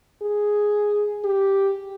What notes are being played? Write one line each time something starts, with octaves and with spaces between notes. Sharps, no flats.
G#4
G4